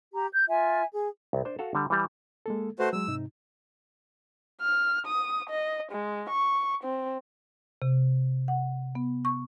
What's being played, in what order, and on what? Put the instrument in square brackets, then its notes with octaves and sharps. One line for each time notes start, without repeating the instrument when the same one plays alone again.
[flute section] G4 A#5
G6
F4 E5 G#5
G#4
[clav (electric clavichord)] C2
D4 C5
F#4 A4 F5
D3 G3
E3 G3
[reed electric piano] G#3 A#3 A4
[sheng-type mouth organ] A3 F#4 C5 [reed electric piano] B4
[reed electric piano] F#3 G#3 [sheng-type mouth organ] E6
[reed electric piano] G#2 C3 D#4
[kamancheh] F6
D#6
D#5
G#3
C#6
C4
[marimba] C3
F#5
B3
C#6